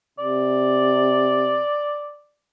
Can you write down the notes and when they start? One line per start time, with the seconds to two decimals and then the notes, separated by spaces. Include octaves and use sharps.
0.19 C3 D5